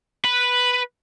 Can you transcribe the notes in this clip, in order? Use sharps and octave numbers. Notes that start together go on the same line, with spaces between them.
B4